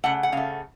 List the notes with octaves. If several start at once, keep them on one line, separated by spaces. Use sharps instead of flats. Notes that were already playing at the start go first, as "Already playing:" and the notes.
C#3 A3 F#5
F#5
C#3 A3 F5